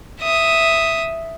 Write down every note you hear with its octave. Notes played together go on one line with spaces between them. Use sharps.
E5 D#6